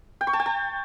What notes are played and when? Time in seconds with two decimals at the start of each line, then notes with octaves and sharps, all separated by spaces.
0.21 G5
0.27 C#6
0.33 A5
0.40 G5
0.46 A5